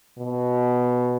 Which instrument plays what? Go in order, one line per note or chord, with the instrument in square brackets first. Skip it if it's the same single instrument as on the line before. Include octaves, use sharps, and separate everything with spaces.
[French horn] B2